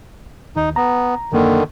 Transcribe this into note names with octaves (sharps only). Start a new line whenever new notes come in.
D#2 D#4
B3 A#5
F#2 D3 D#3 A#3